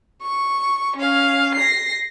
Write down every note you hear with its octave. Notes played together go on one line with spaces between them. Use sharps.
C#6
C#4 F5
A#6 C7